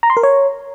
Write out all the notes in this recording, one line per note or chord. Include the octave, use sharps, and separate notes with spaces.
A#5
C6
A#4
C#5